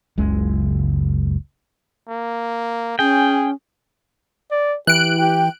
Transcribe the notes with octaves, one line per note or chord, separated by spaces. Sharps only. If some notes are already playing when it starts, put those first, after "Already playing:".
F#1 C#2 G#3
A#3
C#4 G#4 G5
D5
E3 G4 F#6 D7
G4 G5